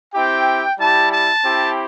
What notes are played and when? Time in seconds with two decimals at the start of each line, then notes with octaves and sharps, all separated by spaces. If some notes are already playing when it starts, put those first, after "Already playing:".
0.12 C4 E4 G4 G5
0.78 G3 E4 G4 A5
1.11 A5
1.43 C4 E4 G4